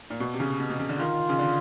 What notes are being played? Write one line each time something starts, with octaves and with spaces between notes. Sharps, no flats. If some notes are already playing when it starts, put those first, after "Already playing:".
A#2
B2
C3
C#3
B2
B2
C#3
D3
D#3 F4
C#3
D3